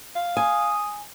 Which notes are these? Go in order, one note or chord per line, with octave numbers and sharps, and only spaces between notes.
F5
G#5 D#6